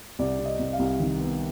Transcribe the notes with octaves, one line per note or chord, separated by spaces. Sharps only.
C2 D5
C3
D#5
C2
F5
C2
D#3
B3